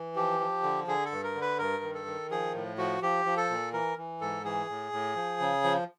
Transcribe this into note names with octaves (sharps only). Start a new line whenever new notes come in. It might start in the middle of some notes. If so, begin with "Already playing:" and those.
Already playing: E3
F3 G4
F3
D3
D3 G#4
A4
G2
A#4
D3
B4
G2 A#4
D#3
A4
D#3
F3 G#4
A2
F3 F#4
F3 G4
F3
A4
A#2
E3 A#4
E3
G#2 A4
E3 G#4
A2
A2
F3
C#3
F3